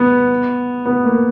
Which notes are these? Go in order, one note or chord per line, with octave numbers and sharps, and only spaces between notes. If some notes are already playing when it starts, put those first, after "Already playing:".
Already playing: B3
B3
A#3